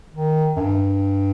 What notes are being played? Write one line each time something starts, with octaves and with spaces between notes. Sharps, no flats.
D#3
F#2
G2